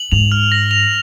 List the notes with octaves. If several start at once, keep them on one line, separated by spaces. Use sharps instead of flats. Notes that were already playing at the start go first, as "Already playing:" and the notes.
Already playing: F#7
G#2 F7
F6
A#6
F7